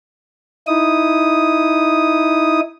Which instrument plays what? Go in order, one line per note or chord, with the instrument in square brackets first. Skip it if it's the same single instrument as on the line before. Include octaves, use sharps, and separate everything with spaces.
[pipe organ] D#4 E4 D#6